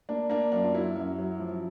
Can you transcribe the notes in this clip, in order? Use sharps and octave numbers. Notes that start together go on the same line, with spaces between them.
A#3 D4
A#3 D4
F#2 D4
F4
F#3 E4
F#2
F#3
F3